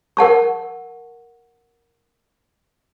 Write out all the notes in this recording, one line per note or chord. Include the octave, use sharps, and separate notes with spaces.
A#4 F#5 A5 C#6